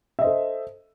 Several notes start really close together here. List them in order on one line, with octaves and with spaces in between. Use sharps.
E5 D#5 C5 A4